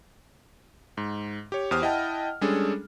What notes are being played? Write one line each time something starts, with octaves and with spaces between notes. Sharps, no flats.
G#2
G4 C#5
E2 G4 C5 D#6 F6
E4 D#5 F#5 G5 A5
G3 G#3 C#4 D4 G#4 A4